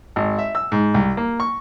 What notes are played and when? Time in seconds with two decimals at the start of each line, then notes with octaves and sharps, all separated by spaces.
0.16 G#1
0.38 E5
0.55 E6
0.72 G#2
0.94 C2
1.17 A#3
1.40 C#6